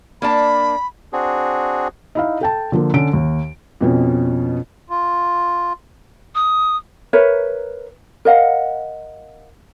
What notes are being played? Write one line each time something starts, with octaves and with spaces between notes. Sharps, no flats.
A#3 D4 A5 B5
C4 D4 F#4 G#4
D#4 E4 F5
A4 G5 A5
D3 F3 A#3
D3 C#4 D7
D#2
F2 B2 C#4
F4
D#6
A#4 B4 C#5 E5
A#4 D#5 F5 F#5